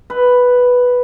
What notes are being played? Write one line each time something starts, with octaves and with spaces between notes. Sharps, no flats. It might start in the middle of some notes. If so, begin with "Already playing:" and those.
B4